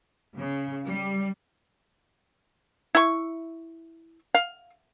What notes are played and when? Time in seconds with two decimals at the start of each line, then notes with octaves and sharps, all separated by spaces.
0.39 C#3
0.86 G3
2.95 E4 C#6
4.34 F5